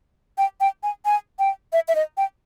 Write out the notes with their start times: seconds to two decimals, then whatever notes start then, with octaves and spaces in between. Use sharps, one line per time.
0.38 G5
0.60 G5
0.83 G#5
1.05 G#5
1.39 G5
1.73 E5
1.88 E5
1.95 D#5
2.17 G5